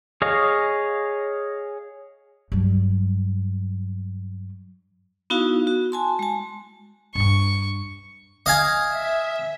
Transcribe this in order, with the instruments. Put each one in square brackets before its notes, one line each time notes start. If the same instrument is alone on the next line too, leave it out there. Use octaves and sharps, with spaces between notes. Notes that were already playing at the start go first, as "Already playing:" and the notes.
[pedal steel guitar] G#4 C#5 D#5 F5
[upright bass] G2 F#3
[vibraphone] B3 D#4 E4 F#4 F5
F#4
G#5 A5 C6
G#3 A5
[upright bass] G2 D4 [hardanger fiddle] C#6
[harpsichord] D#5 F5 G#5
[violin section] E5